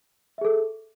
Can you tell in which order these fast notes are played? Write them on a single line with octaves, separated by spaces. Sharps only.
E5 G#4 A4